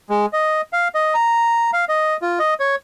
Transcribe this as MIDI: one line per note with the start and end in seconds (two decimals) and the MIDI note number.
0.10 0.26 56
0.33 0.61 75
0.73 0.88 77
0.95 1.14 75
1.14 1.71 82
1.73 1.85 77
1.89 2.17 75
2.22 2.39 65
2.39 2.54 75
2.60 2.75 73